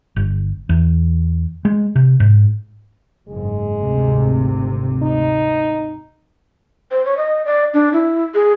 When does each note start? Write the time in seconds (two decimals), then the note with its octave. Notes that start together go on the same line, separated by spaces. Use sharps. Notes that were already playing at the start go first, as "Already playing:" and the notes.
0.16 G1
0.69 E2
1.65 G#3
1.95 C3
2.20 G#2
3.28 F#1 G#2 G#3
3.80 G#1 D2 C3
5.02 D#4
6.91 C5
7.05 C#5
7.18 D#5
7.46 D5
7.74 D4
7.93 E4
8.35 G#4